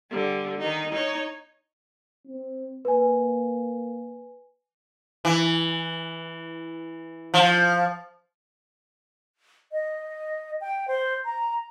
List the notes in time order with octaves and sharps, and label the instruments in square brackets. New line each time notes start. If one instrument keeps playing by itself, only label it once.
[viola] D3 G3
D#3 D#4
D#4 C#5
[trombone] C4
[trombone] A#3 [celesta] B4 G#5
[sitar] E3
F3
[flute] D#5
G5
C5
A#5